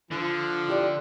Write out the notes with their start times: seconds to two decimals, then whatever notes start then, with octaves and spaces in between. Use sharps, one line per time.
0.11 D3 F3
0.68 E4 G4 D5